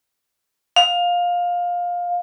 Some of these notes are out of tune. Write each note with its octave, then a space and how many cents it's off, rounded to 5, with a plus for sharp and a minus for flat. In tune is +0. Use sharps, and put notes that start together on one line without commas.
F5 +15